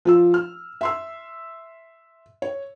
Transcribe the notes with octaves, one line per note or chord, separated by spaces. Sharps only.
F3 F4 E6
F6
E5 C6 E6
C#5